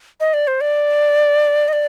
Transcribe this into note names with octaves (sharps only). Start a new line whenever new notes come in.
D#5
D5
C5
D5
D#5
D5